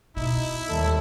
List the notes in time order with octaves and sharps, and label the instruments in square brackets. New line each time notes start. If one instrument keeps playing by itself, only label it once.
[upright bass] B2 [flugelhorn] D#4 [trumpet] E4
[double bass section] D#2 G3 [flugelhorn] A4